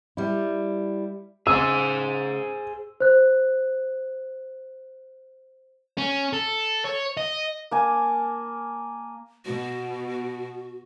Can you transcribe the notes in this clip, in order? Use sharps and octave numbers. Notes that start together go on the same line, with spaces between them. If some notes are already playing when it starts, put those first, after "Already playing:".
G3 E4
C#3 G#4 C5 E6
C5 F#6
C#4
A4
C#5
D#5
A#3 G#5 A5
B2 F#4